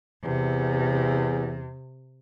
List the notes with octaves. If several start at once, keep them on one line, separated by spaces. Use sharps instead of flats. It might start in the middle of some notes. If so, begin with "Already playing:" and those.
E2 C3